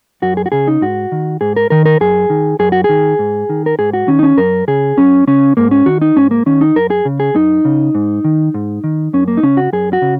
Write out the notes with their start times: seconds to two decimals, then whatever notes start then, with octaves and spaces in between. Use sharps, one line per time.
0.22 F#2 F#4
0.37 G#4
0.46 F#4
0.52 C#3 G#4
0.68 D#4
0.81 G#2 F#4
1.12 D#3
1.41 G#2 G#4
1.56 A#4
1.70 D#3 A#4
1.86 A#4
2.01 F#2 G#4
2.30 D#3
2.59 F#2 G#4
2.72 F#4
2.84 D#3 G#4
3.19 G#2
3.49 D#3
3.66 A#4
3.79 G#2 G#4
3.93 F#4
4.08 D#3 C#4
4.19 D#4
4.23 C#4
4.38 F#2 A#4
4.68 C#3 G#4
4.97 F#2 C#4
5.27 C#3 C#4
5.57 G#2 A#3
5.71 C#4
5.86 D#3 F#4
6.02 D#4
6.16 G#2 C#4
6.31 A#3
6.46 D#3 C#4
6.61 D#4
6.76 F#2 A#4
6.90 G#4
7.05 C#3
7.20 G#4
7.35 F#2 D#4
7.65 C#3
7.95 G#2
8.24 D#3
8.54 G#2
8.84 D#3
9.13 F#2 C#4
9.28 A#3
9.37 D#4
9.43 C#3 C#4
9.57 F#4
9.73 F#2 G#4
9.93 F#4
10.02 C#3